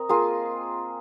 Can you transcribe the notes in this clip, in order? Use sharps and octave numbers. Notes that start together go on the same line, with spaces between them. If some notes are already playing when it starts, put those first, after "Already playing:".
Already playing: C4 A#4 D#5
A#3 F4 G#4